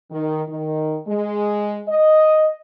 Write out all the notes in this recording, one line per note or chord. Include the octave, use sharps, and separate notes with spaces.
D#3
D#3
G#3
D#5